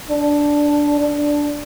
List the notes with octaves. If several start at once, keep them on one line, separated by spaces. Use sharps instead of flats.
D4
D4